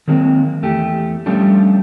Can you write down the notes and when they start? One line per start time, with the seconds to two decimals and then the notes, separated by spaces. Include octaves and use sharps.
0.08 D#3 F#3 G#3 A#3 C4
0.62 E2 A3 G4
1.26 F3 G3 A3 C#4 D4 G4